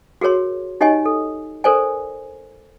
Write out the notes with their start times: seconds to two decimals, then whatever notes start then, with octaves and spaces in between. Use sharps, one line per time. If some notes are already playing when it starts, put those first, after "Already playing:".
0.21 F#4 G#4 A#4 C#5 C6
0.81 D#4 G4 C#5 D#5 G#5
1.05 A4
1.64 A4 A#4 C5 D5 G#5